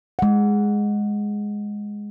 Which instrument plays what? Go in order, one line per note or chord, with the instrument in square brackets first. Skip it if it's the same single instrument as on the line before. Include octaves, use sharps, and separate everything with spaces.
[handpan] G#3 F#5